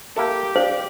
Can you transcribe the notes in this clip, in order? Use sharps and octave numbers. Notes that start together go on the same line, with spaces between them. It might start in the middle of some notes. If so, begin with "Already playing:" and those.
A#3 E4 G4 A4
C4 C5 D5 F5